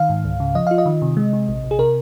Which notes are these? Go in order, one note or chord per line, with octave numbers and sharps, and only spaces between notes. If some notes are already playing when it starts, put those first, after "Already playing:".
Already playing: D#3 F5
G#2
C#2
C#3
F3 D#5
F4 F5
D#5
D#3
C3
G#3
C3
A#1
A#1
G#4
C3 A#4